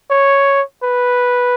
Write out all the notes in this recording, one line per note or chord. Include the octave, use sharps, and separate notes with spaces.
C#5
B4